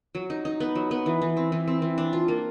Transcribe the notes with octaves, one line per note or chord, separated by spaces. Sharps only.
F#3
D#4
D#4
B3
F#3
B3
E3
E3
C4
E3
C4
E3
D4
F4
A#3